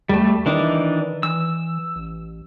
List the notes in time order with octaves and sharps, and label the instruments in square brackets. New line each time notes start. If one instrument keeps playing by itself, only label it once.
[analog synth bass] E2 [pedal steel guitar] G3 A3
[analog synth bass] D#3 [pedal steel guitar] E3 D4 D#4
[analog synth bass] E3 [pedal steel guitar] E6
[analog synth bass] A1